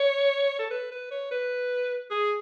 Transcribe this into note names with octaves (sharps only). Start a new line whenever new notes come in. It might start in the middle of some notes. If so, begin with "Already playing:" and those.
Already playing: C#5
A4
B4
B4
C#5
B4
G#4